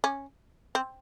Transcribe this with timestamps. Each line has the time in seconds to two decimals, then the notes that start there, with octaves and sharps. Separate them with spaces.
0.04 C#4
0.75 C4